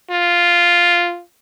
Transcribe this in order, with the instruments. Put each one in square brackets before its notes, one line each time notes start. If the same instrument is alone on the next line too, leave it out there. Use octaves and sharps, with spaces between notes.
[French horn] F4